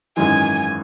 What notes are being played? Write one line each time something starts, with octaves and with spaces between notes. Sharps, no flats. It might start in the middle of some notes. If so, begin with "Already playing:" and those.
G#1 F#2 E3 G#3 G#5